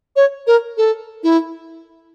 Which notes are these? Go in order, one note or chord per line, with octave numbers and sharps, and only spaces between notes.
C#5
A#4
A4
E4